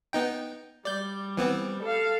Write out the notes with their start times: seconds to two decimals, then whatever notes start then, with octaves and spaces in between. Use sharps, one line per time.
0.13 B3 D#4 G5
0.85 G3 D5 G6
1.37 E3 B3 C4
1.82 A4 F5